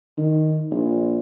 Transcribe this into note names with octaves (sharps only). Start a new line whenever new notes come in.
D#3
A#1